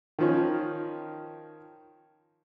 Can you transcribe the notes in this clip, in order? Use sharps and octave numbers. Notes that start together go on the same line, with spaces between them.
D#3 F3 C#4